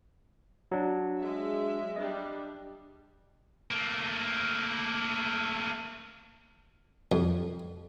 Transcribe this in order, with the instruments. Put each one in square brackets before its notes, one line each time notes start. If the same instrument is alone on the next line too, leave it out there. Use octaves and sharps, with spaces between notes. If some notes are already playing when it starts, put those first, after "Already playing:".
[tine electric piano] F#3 D4
[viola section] G#3 E5
[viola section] G3 D4 [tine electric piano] D#5
[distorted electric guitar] A3 A#3
[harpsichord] F2